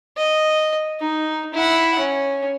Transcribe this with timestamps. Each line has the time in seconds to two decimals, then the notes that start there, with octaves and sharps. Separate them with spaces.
0.17 D#5
0.99 D#4
1.53 E4 F#5
1.99 C#4